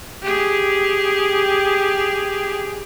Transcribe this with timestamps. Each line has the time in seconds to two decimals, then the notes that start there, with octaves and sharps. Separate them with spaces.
0.22 G4 G#4